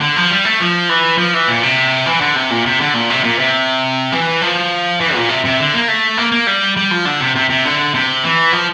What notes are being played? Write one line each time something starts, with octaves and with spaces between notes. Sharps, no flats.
D3
F3
G3
A3
F3
E3
F3
E3
A#2
C3
E3
D3
C3
A#2
C3
D3
A#2
C3
A#2
C3
E3
F3
E3
A#2
C3
C3
D3
A#3
A3
A#3
A#3
G3
G3
F3
D3
C3
C3
C3
D3
C3
E3
F3